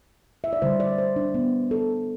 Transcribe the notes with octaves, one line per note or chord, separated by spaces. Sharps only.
E5
D5
D3 G3 C5
D5
C5
D4
B3
A4